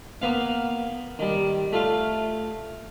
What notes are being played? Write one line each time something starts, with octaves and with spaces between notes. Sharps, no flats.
A#3 B3 F5
D#3 G3
A3 F4 F5